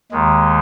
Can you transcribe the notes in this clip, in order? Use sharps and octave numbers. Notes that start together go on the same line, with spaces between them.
D#2 D#3 G#3